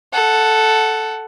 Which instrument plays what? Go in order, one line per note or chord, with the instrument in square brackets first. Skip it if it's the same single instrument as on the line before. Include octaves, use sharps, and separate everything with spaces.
[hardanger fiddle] A4 F#5